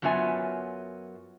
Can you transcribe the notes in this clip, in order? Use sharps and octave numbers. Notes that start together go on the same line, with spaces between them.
F#2 F#3 B3 F4 E5 G#5